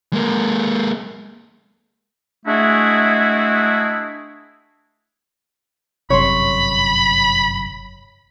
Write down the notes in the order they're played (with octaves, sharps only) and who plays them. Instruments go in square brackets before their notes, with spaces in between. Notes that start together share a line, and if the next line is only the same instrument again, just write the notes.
[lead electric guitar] G#3 A#3
[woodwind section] G#3 A3 D4 E4 F#4 G#4
[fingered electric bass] G1 F#2 C3 [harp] C#5 C6 [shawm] B5